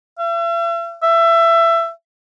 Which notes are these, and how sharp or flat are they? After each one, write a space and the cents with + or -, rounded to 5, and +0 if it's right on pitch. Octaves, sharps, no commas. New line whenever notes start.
E5 +45
E5 +20